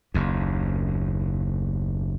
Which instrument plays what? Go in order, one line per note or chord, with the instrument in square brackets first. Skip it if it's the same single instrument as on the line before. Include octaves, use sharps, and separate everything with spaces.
[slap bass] F#1 D#2